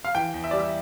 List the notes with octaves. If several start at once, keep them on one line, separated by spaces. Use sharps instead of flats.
F5
E3 G5
E2
E5
G3 D5
E5